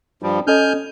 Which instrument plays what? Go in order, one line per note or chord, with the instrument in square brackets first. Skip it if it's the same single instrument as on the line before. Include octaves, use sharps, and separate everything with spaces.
[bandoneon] G2 F3 G3
[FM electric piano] C#4 A4 D#5 [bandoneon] G#5 F6 G6